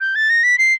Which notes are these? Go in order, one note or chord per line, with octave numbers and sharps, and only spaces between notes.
G6
A6
A#6
B6
C7